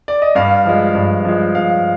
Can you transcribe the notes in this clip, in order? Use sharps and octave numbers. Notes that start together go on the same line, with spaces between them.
D5
D#5
G2 F5
F3 G#3
G2
F3 G#3
G2 F5